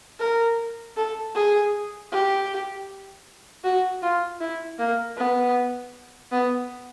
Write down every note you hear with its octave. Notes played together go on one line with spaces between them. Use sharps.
A#4
A4
G#4
G4
F#4
F4
E4
A#3
B3
B3